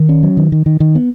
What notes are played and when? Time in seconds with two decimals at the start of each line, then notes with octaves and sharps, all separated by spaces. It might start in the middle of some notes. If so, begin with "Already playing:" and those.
Already playing: D#3
0.09 C#4
0.23 F#3
0.37 D#3
0.52 D#3
0.66 D#3
0.80 D#3
0.95 B3